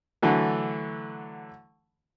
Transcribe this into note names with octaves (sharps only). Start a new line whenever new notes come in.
D3 E3 F#3 A3